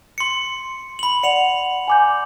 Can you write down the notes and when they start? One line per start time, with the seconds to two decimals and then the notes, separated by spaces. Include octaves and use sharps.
0.18 C6 C#7
0.99 B5 F#7
1.23 D5 F#5 C#7 F7 F#7
1.88 G#5 D6 G6